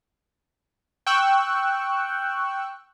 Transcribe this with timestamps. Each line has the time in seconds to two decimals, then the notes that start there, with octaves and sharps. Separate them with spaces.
1.06 G5 C#6 E6 F#6